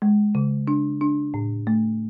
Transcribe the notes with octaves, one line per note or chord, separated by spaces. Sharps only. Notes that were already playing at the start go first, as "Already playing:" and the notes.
G#3
C#3
D4
D4
A2
A3